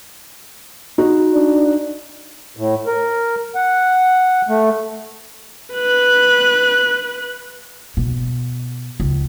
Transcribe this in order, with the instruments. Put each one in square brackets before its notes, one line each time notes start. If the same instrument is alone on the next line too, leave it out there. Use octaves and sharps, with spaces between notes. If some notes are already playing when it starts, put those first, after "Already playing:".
[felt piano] D#4 F#4
[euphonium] D4
[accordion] A2
A#4
F#5
A3
[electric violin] B4 F#6
[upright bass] B2
C#2